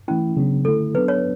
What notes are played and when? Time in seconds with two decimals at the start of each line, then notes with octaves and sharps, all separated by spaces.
0.08 E3 A3 C#4 E4
0.37 C#3 F#3 B3 D4
0.65 D3 A3 E4 A4
0.94 F#3 B3 D4 B4
1.08 C#5